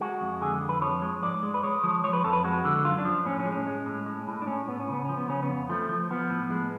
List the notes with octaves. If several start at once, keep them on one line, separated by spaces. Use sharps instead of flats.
G#3 F#4
F2
D3 G#4
F2
B4
F3 C#5
G#3
G#2 D5
G#3
B4
G#3 C#5
F3
F3 C#5
B4
F2 A4
B4
G#3 F#4
D3
F#2 F4
D4
F3
A2 C#4
C#4
G#3
C#4
G#3
A2
G#3
A2
D4
A2 C#4
A2 B3
C#4
C#3 B3
F3 C#4
B3
C#3 C#4
B3
F2
F3 A3
F3
F3 B3
A2
G#3